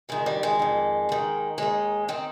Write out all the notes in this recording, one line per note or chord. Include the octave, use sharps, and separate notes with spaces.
F2 D#3 G#3
G3
G#3
F2 D#3
D#2 D#3
D#2 D#3 G#3
D#3 C4